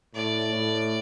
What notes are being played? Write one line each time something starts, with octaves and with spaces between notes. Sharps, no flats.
A2 D5
A2